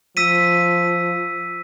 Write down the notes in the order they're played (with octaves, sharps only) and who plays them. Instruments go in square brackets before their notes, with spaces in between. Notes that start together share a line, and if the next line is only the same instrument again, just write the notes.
[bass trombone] F3 [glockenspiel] E6 B6 D#7